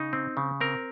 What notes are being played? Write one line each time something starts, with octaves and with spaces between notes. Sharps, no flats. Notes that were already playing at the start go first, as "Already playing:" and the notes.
Already playing: C#3 D#4
C4
C#3
C4 A#4